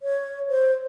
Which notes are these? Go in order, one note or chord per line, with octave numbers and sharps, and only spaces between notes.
C#5
C5